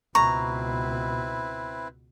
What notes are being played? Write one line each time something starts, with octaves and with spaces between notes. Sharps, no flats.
C#2 B2 C4 E4 B4 A#5 C#6